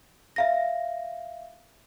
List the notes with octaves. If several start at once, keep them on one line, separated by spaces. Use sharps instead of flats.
E5 F5 A#6